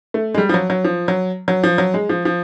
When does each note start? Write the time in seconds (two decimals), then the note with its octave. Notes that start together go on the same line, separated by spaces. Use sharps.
0.14 A3
0.34 G#3
0.38 G3
0.49 F3
0.54 F#3
0.70 F#3
0.85 F3
1.08 F#3
1.48 F#3
1.64 F3
1.78 F#3
1.94 G#3
2.09 F3
2.25 F3